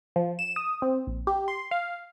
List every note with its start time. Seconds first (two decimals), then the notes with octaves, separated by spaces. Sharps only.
0.16 F3
0.39 E7
0.56 D#6
0.82 C4
1.07 A#1
1.27 G4
1.48 C6
1.71 F5